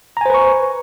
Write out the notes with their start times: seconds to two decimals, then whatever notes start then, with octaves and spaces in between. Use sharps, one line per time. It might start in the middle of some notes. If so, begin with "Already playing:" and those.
0.17 A#5
0.21 G#5
0.26 C5
0.30 B4
0.34 C#6